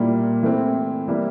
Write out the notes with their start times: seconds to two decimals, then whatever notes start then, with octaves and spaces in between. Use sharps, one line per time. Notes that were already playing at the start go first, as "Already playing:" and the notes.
Already playing: A#2 G3 A#3 E4
0.43 E3 A3 C4 E4
1.08 E3 G3 A#3 E4